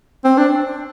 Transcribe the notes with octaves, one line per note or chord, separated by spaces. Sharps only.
C4
D4